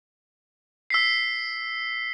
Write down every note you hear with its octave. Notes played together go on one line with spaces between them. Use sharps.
E6 B6 C7